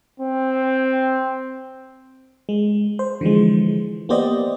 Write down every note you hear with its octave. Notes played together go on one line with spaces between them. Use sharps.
C4
G#3
C5
D3 E3 F3 G#3
A#3 B3 G4 C5 D5 D#5